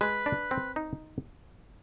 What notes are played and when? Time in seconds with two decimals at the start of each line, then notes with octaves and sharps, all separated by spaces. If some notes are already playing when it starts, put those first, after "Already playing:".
0.01 G#3 B4
0.26 D4
0.51 C4
0.76 D#4